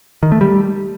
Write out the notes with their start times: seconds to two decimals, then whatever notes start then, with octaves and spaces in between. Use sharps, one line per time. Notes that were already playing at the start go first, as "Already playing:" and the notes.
0.23 D#3
0.32 A3
0.41 G3